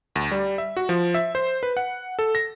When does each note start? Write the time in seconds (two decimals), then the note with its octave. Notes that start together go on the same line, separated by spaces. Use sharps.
0.16 D2
0.31 G3
0.58 E5
0.77 F#4
0.89 F3
1.14 E5
1.35 C5
1.63 B4
1.77 F#5
2.19 A4
2.35 A#6